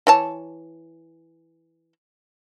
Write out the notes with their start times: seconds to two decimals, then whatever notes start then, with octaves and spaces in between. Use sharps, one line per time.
0.07 E3 C#5 A5